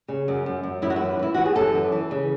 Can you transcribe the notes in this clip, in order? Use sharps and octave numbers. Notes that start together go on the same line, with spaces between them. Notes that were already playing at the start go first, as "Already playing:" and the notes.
C#3
F#2
F#2
F#2
F#2 E4
F#4
E3 E4
E3 E4
E3 F#4
G#4
F#2 A4
E3
E3
C#3